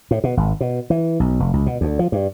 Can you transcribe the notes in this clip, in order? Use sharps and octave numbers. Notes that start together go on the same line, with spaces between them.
A2
B2
G#1
B2
E3
B1
F1
C#2
B2
D2
F3
G2